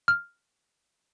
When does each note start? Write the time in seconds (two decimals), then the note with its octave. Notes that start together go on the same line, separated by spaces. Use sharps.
0.08 F6